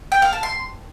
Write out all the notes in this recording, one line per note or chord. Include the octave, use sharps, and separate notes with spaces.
G5
F5
A5
C6